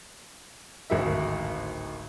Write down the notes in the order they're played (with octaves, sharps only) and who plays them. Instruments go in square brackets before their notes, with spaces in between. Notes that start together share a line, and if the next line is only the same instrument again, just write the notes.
[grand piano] D1 G#1 F#4 A#4 E5